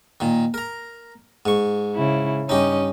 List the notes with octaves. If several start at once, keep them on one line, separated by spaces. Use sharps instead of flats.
A#2 D#3
A#4 A#5
G#2 C#6
C#3 E4
G2 C#4 D#4 G4 D#5